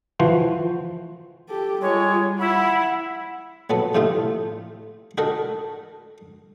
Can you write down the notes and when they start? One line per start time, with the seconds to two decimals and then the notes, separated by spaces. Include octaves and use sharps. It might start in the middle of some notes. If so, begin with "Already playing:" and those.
0.19 E3 F3 F#4 C5
1.49 G4 A4
1.82 G3 G#3 F4 C#5
2.40 E4 F#5 B5
3.70 A#1 F#3 B3 A4
3.95 A2 C3 A3 D#4 F4
5.18 D#4 F#4 A4 A#4